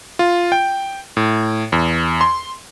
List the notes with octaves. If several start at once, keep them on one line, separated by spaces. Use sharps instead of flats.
F4
G5
A2
E2
C6